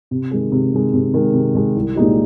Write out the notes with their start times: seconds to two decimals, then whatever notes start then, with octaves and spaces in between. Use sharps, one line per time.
0.11 C3
0.31 D#3 G#3
0.52 C3
0.73 D#3 G#3
0.94 C3
1.14 D#3 G#3
1.34 C3
1.55 D#3 G#3
1.76 C2
1.96 A#2 G#3 D#4 G4